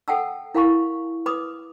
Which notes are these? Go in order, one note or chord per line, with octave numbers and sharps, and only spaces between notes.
A4 F#5 G5 A5 E6
E4 A#4 F5 G#5 B5 C#6
B4 B5 D6 D#6